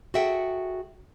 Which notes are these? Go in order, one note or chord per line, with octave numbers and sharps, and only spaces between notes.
F#4 G#4 A4 E5 F#5 G5